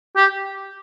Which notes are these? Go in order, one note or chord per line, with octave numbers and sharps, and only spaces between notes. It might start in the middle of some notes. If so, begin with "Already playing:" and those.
G4